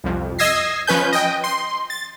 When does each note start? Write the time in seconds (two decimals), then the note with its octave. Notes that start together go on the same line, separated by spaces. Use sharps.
0.04 C2 F2
0.39 D#5 D#6 E6 G#6 A#6 C7
0.87 F3 C#4 B4 G#5 G6
1.12 D#5 G5
1.44 C6
1.90 A6